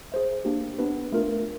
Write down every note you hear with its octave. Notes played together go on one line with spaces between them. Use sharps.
G#4 C5 E5
A#3 D4 G4
B3 D4 G4 B4
A3 D4 F4 A#4